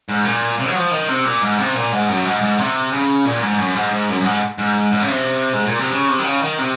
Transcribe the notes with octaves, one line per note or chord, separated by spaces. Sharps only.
G#2
A#2
C3
F#3
F3
D#3
C3
A#2
G#2
C3
A#2
G#2
F#2
G#2
G#2
C3
C#3
A#2
G#2
F#2
G#2
G#2
F#2
F#2
G#2
G#2
G#2
C#3
C3
G#2
A#2
C3
C#3
C3
D#3
C#3
D#3
C3